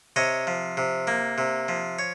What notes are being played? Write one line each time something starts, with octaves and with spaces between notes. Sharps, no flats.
C3 C#5 D#5
F3
C3
A#3
C3
F3
C#5